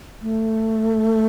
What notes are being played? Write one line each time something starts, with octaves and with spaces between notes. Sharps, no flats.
A3